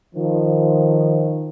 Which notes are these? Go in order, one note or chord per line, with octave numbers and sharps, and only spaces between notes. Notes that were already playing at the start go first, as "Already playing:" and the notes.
D#3 F3